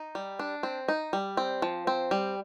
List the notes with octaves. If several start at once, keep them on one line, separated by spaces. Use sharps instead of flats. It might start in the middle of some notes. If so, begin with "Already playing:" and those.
Already playing: D#4
G3
D4
C4
D#4
G3
C4
F3
C4
G3